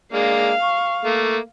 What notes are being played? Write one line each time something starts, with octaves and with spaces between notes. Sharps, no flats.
G#3 A#3 D4 F5
C#6
A3 A#3